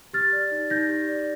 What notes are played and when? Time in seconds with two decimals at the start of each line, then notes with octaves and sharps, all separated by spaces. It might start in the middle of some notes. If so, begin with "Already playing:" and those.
0.13 G4 F6 A6
0.32 D5
0.51 D#4
0.70 D#4 G6 A#6
0.89 G4
1.08 D5